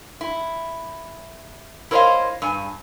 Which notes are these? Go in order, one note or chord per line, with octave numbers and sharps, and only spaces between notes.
E4
E4 A#4 C5 C#5 D#5 F5
G2 G#5